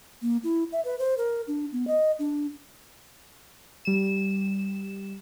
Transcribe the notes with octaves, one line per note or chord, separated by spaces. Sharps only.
A#3
E4
E5
B4
C5
A#4
D4
B3
D#5
D4
G3 E7